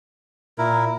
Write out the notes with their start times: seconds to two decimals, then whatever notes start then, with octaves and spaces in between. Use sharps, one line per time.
0.58 A#2 E4 A#4